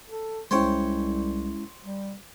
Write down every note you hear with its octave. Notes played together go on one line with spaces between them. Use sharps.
A4
C2 G#3 C#4 E4 C5 C#5 G5
G3